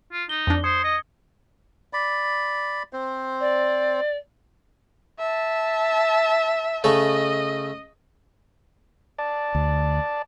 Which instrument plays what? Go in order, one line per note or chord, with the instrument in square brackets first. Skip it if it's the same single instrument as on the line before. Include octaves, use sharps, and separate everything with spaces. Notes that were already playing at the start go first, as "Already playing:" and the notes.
[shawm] F4
[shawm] D#4 [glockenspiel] G7
[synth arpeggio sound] F2 D4
[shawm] C5 [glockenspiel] D#6 G#6 C#7
[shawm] D#5
[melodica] D5 B5
C4 C5
[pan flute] D5
[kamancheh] E5 A5
[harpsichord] C#3 A3 A4 [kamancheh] D#5
[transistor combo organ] D5 A5
[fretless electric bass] D2